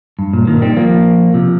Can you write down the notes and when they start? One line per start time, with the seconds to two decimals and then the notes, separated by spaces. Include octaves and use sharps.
0.19 G2
0.33 A#2
0.47 A#2 D#3
0.62 G3 C4
0.76 F3 A#3
1.34 C3 F3